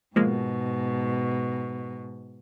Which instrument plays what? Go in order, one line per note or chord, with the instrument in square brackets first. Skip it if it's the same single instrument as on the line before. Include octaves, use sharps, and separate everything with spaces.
[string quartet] G#2 B2 [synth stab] F3 G#3 A#3